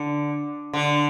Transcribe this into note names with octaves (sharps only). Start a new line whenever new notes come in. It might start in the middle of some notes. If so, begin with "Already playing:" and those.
Already playing: D3
D3